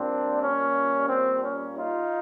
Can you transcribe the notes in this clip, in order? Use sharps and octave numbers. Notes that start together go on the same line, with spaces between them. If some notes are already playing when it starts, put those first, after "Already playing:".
Already playing: A#2 G3 A#3 C4 D4
C#4
C4
C#4
D#4 F4